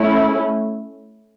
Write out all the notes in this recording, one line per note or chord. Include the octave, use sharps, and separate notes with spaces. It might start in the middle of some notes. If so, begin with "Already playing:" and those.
Already playing: A3 C#4 E4